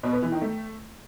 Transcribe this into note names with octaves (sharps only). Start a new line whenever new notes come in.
B2
B3
E3
D#3
A3